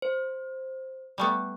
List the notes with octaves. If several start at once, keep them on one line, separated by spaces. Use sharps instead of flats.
C5
G3 A3 B3